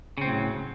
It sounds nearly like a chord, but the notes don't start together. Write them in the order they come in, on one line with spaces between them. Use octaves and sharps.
C#3 C4 A2 F#3